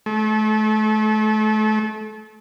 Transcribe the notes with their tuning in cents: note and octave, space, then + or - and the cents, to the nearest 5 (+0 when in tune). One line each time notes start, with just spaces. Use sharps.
A3 -30